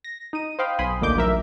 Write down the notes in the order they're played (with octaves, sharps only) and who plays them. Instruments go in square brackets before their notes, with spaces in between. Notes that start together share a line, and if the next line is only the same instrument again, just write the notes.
[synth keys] A#6
D#4 D#7
C5 D#5 F5 G5 B5
B1 G#5 B5 C6 D#6
A1 D2 A#3 D#4 D6 G6
A#1 F#3 A#4 E5